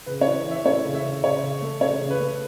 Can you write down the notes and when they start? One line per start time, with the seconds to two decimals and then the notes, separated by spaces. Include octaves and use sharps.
0.06 C#3 B4
0.21 C#5
0.26 E3
0.46 E3 E5
0.65 A3 C#5
0.84 C#3
0.95 E5
1.04 C#3
1.23 C#3 C#5
1.43 C#3
1.62 A3
1.81 C#3 C#5
2.01 C#3
2.10 B4
2.20 A3